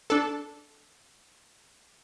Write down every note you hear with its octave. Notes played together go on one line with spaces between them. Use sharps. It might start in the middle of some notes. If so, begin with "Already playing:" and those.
D4 A4